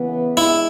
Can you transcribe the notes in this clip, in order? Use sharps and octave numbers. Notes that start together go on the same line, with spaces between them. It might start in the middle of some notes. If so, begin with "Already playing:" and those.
Already playing: C#3 E3 B3
G#3 D4 E4 G#4